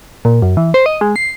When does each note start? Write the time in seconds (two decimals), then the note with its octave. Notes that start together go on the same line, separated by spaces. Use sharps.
0.25 A#2
0.42 F#2
0.57 E3
0.74 C5
0.86 D#5
1.01 G#3
1.16 C7